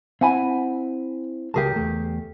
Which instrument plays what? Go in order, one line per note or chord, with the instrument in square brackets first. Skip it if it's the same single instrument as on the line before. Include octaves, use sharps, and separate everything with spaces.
[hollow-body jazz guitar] C4 E4 [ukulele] F#5 G#5 B5
[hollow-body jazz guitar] C#2 A5 [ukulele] G4 G#4 A#4
[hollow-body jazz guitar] E2 A3